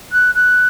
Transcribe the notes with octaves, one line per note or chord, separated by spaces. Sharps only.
F#6
F#6